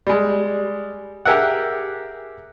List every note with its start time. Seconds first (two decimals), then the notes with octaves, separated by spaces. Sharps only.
0.07 G3 G#3
1.25 G4 G#4 A#4 E5 F#5